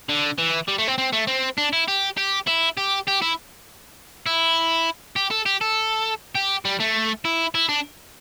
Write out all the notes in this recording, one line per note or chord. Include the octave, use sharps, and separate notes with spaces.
D3
E3
G3
A3
C4
C4
A3
C4
D4
E4
G4
G4
E4
G4
G4
E4
E4
G4
A4
G4
A4
G4
G3
A3
E4
E4
D4